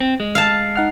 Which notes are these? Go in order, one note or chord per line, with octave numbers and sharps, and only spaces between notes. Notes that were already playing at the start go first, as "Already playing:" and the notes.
C4
G#3
F5 A5
D#4 F#5 F6